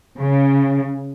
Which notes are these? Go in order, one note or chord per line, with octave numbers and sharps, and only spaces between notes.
C#3